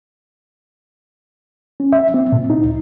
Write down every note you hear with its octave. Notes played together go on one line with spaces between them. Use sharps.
C#4
E5
C4
A#2
D#4
C#2